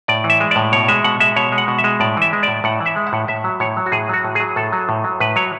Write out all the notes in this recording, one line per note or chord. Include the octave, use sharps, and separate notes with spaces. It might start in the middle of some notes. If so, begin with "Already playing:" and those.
A2 D5
E3
E5
G#3
A2 D5
B2 C#5
G#3 E5
B2 F#5
G#3 E5
B2 C#5
G#3
F#5
B2
E5
G#3
A2 D5
E3 E5
G#3
A2 D5
A2 F#5
E3
E5
G#3
F#5
A2
A2 E5
F#3
A2 C#5
F#3
F#4
A2 G#4
F#3 F#4
A2
F#3 G#4
A2 A4
F#3
A2
F#3
A2 B4
F#3 C#5